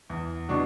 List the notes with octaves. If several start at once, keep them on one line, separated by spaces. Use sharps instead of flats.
E2
B2 F#3 D4 F#4